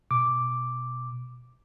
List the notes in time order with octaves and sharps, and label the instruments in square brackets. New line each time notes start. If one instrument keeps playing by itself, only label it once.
[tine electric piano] B2 D6